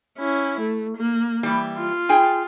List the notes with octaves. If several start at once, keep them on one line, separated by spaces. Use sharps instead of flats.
C#4 E4
A3
A#3
E3 G3
F4
G#4 G5 G#5